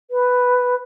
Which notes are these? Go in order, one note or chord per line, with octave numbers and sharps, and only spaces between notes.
B4